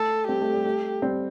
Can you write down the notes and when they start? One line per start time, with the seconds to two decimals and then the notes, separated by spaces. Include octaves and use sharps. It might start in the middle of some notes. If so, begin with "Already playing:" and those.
Already playing: A3 A4
0.29 G3 C4 G4
0.41 A3
0.53 G3
0.65 A3
1.02 G3 C4